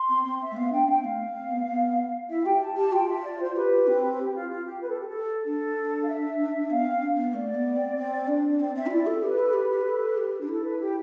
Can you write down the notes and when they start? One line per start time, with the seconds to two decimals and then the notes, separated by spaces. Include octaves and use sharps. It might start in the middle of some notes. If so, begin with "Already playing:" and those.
Already playing: C6
0.09 C4
0.25 C4
0.42 E5
0.51 A3
0.56 B3 F5
0.73 D4 G5
0.88 C4 G5
1.03 A3 F5
1.35 C4
1.51 B3
1.67 B3
2.30 E4 E5
2.45 G4 G5
2.62 A5
2.77 G4 A5
2.93 F4 G5
3.09 E5
3.24 D5
3.41 F4 C5
3.56 G4 B4
3.87 C4
4.19 G4
4.35 F4
4.50 F4
4.66 G4
4.82 B4
4.90 A4
5.00 G4
5.07 A4
5.44 D4 A4
6.04 F5
6.08 E5
6.71 B3 F5
6.86 C4
7.02 D4
7.18 B3
7.34 A3 D5
7.55 B3
7.76 C4
7.96 C4
8.28 D4
8.60 C4 D5
8.75 C4 E5
8.86 F4
8.91 E4 D5
9.07 A4
9.22 G4 B4
9.38 A4
9.54 G4
9.71 G4
9.86 A4
10.17 G4
10.41 D4
10.48 E4 A4
10.64 B4
10.80 G4